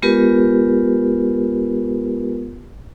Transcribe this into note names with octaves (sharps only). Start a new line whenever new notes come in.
G#3 B3 F4 G4 A#4 B4